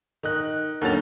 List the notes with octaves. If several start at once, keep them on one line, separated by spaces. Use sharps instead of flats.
D#3 D#5 F#6
D#2 D3 F#3 C#4 A6 F7